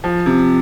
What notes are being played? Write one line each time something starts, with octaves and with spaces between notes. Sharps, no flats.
F3
C3